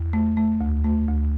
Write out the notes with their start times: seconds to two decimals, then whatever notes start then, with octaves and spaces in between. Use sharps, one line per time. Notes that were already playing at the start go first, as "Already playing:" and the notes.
Already playing: E2
0.13 A3
0.37 A3
0.61 D2
0.84 A3
1.08 D2